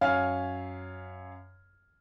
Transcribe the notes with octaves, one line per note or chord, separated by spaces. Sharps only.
F#2 C#5 F5 G#5 F6